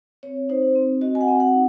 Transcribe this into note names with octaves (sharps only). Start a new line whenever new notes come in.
C4 C#5
D#4 C5
C4
F#4 D#5
G#5
F#5
C4
F#5
D#4